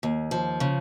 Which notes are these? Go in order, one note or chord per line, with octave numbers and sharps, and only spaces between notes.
D#2
F3
C#3